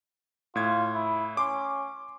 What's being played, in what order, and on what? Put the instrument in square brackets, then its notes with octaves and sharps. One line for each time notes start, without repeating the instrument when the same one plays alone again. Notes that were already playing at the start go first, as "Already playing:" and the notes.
[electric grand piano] A2 G#6 [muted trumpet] F4
[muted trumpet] E4
[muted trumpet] C#4 [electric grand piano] C6 D6